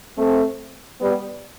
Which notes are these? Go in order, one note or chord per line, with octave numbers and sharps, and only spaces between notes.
A3 C4
G3 B3